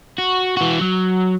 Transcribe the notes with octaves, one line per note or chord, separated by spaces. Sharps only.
F#4
E3 F#4
F#3